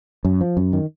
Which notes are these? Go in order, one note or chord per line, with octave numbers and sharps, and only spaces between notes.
F#2
F3
F#2
D#3